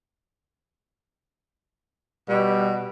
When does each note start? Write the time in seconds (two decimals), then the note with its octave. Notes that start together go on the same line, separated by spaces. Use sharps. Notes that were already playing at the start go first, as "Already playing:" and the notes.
2.29 B2 G3